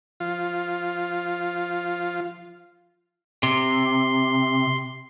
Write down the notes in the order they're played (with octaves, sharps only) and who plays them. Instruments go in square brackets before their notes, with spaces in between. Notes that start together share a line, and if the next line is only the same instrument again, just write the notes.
[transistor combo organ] F3 F4
[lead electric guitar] C3 [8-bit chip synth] C6